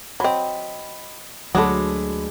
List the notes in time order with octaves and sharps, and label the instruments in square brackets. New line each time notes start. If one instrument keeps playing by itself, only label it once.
[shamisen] F#3 C4 [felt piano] D#5 B5
[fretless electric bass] D2 F#3 [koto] D3 G#3 [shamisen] F#4 A4 [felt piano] B5 D6